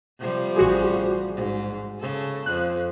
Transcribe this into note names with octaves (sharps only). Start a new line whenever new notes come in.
C3 F3 G3
A1 F#4 G#4
G#2
C#3 A4
F2 F#6